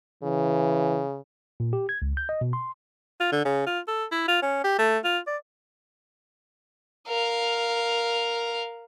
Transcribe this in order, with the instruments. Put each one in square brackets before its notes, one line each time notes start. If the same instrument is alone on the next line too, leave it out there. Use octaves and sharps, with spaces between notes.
[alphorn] C#3 [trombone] E3
[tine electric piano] A#2
G4
G#6
C#2
G6
D#5
B2
C6
[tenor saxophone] F4
D3
C#3
F4
A4
E4
F4
C#4
G4
A3
F4
D5
[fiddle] A#4 F5